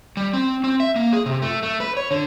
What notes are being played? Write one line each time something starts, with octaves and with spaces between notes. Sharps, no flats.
G3
C4
C4
E5
A#3
G#4
C3
A3
A3
B4
C#5
D3